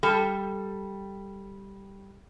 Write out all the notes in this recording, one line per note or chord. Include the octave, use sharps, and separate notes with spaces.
G3 A4